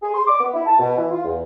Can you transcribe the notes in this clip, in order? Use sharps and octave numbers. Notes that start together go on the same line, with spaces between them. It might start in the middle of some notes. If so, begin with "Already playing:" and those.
G#4
C6
D6
B3
E4
A5
B2
E3
F4
E2